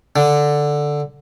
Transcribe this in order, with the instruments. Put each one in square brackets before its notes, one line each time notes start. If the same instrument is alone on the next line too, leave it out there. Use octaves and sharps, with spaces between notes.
[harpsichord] D3